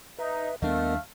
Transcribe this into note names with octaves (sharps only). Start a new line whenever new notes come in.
D#4 B4 E5
D#2 G3 A3 B3 D4 A#4 D#5 F5